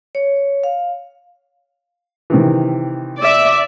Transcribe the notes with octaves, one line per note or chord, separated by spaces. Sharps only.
C#5
F5
C3 D#3 E3
D5 E5